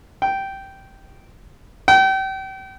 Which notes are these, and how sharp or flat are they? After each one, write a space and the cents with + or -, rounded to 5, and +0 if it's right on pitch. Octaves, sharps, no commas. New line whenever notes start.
G5 -10
G5 -35